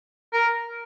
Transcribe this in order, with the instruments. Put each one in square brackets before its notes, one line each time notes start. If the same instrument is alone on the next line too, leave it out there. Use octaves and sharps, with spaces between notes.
[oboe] A#4